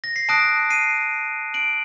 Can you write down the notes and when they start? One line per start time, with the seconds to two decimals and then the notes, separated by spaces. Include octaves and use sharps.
0.04 A#6
0.16 C7
0.29 A5 D#6 F#6 A#6 D7
0.70 C7 D#7
1.54 D7 F#7